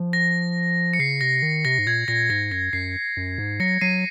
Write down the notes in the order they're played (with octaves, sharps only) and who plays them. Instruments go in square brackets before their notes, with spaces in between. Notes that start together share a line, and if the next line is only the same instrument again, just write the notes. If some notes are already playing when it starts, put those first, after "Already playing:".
Already playing: [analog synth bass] F3
[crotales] A#6
C#7
[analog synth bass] C#3 [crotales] C7
[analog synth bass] C3 [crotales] A#6
[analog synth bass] D#3
[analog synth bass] C3 [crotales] A#6
[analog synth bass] G#2
[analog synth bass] A#2 [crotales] G#6
[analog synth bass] A#2 [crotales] A#6
[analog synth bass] G#2 [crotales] A#6
[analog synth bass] F#2 [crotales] A#6
[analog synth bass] F#2 [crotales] C7
[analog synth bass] F#2
G#2
[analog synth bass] F#3 [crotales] A#6 C#7
[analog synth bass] F#3 [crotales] C7 D#7